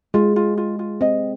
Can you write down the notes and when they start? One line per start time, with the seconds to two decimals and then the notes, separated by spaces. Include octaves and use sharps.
0.14 G#3 F4
0.36 F4
0.57 F4
0.79 F4
1.01 C4 D#5